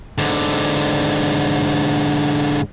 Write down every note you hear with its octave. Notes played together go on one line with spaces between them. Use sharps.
G#2 D3